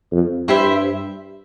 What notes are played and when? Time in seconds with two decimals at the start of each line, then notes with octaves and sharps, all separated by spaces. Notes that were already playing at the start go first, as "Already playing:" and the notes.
0.12 F2
0.48 G2 E4 G4 C5 E5